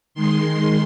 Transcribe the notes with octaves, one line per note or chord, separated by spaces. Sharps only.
D#3 G#3 C6